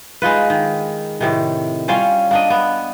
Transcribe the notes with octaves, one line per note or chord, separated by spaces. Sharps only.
G#3 D#4 F4 B4
D#3
A2 C3 D#3
G3 C#4 F4 F5
A#3 D4 D#5
B3